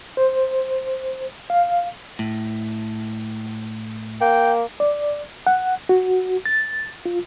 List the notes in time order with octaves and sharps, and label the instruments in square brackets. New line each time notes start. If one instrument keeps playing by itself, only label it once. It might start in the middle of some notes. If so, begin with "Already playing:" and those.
[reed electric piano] C5
F5
[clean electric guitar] A2
[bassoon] A#3 [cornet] G5
[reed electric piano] D5
F#5
F#4
A6
F4